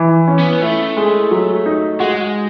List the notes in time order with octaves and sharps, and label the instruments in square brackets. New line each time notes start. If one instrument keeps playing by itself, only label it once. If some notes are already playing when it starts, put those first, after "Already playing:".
Already playing: [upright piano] E3
C#4
[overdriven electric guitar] B3
[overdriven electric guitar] A3 [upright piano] E4
[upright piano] G#3
F#3
D#4
[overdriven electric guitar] G#3 [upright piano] F#4